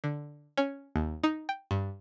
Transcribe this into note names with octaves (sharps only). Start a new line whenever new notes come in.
D3
C#4
D#2
D#4
G5
G2